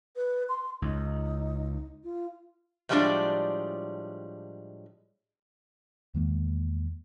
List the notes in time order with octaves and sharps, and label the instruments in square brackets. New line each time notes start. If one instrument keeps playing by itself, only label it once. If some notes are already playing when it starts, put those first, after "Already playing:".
[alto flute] B4
C6
[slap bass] C#2 [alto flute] D#4
[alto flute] F4
[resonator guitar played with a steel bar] A2 F3 G3 G#3 D4 D5
[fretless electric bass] E2 D#3 G#3 A#3